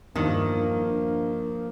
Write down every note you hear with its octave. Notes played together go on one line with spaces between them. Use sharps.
E2 G2 D#3 F3 A#3 D4